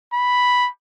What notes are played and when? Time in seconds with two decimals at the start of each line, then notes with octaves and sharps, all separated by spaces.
0.14 B5